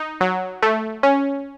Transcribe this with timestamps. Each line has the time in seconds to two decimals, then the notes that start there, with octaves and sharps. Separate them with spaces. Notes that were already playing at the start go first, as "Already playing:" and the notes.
Already playing: D#4
0.21 F#3
0.62 A3
1.03 C#4